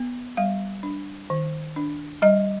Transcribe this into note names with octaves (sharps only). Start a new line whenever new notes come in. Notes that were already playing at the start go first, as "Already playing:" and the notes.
Already playing: B3
G3 F5
D4
D#3
D4
G3 D#5